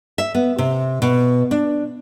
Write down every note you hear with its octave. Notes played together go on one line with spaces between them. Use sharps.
E5
B3
C3
B2
D4